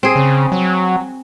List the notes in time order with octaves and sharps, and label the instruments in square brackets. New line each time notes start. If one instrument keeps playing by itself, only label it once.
[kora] C4 G#4
[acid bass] C#3
F#3